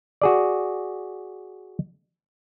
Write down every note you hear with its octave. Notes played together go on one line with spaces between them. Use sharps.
F#4 G#4 D5